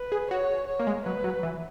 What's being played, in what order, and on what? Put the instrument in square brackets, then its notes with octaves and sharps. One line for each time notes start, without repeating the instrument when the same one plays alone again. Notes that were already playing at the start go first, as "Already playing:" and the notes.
Already playing: [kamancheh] B4
[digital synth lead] G#4
[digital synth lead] F#4 [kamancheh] C#5
[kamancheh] C#5
[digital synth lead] A#3
G#3
[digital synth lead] F#3 [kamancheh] B4
[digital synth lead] F#3
E3